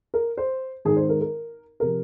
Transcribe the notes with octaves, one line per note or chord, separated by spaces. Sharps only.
A#4
C5
G#1 G#2 D#3 G#4
C5
A#4
A#4
C3 F3 A#4